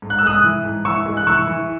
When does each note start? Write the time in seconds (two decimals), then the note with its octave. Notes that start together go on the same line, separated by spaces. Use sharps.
0.02 G#2
0.10 F#6
0.19 E6
0.23 G#3 D#6 F#6
0.44 E3
0.65 G#2
0.85 E3 C#6 E6
1.06 G#3
1.17 F#6
1.27 E3 C#6 E6
1.47 E3